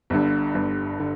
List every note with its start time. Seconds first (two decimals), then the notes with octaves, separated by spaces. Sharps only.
0.10 G1 G2 D3
0.55 G1 G2 D3
1.00 D3